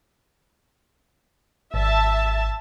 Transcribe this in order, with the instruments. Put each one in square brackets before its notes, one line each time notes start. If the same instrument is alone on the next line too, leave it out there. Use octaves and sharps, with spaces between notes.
[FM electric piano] G#1 [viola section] E5 A5